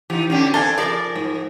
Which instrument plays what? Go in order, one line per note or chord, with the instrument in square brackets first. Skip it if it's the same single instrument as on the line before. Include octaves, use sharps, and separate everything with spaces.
[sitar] E3 D#4 [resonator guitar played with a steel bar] G4
[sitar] B2 D3 G4 [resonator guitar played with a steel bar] C#4 D4
[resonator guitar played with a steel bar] C4 [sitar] D4 [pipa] A4 F5 G#5
[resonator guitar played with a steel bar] F3 G#4 A#4 [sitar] D5
[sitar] G#2